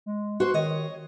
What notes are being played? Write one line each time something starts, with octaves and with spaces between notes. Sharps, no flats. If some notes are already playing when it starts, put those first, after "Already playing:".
G#3
F#4 C5 C6
D#3 C#5 D#5